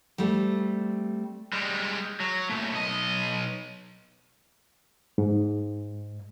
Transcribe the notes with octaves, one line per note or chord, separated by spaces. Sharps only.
G3 A3 C4
G3 G#3
F#3
A#2 A3
B1 D#5
G#2